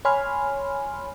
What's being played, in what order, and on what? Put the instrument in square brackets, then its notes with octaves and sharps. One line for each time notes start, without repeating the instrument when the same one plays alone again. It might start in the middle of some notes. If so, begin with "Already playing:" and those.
[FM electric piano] C#5 G#5 B5 C6 F6